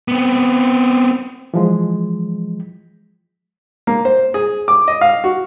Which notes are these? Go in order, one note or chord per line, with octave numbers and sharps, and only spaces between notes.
B3 C4
E3 F3 G#3
A#3
C5
G#4
D6
D#5
F5
F#4